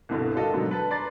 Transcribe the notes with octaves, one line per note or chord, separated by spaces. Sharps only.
C2 G2 B2 D3
D4 F4 F#4 A4 A#4 D#5
G#2 B2 D3 F#3
B4 A5
B4 D5 A#5 C6 A6